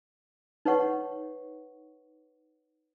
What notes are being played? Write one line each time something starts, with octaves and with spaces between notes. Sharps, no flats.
D#4 B4 C#5 F#5 C#6